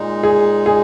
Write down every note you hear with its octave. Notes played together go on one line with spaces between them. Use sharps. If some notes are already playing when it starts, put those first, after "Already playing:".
Already playing: A#2 G#3 D#4
G#4
G#4